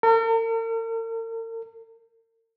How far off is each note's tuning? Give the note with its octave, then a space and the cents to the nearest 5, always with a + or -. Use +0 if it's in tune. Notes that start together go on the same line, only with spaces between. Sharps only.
A#4 -45